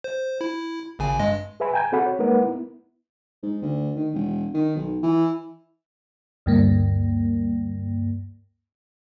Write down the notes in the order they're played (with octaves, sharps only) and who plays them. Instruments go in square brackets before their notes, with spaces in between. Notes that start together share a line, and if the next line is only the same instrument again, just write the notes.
[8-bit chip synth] C5
E4
G#1 C#3 G#5
G2 G#3 D#5
[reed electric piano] G#4 B4 E5 G#5 B5
G5 G#5 A#5 G6 G#6
C4 F#4 G#4 A4 F#5 B5
C#5
G#3 A#3 D#4 A#4 B4 F#5
B3 E4
[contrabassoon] G#2
D2
D#3
E1
D#3
B1
E3
[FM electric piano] D2 G2 A#3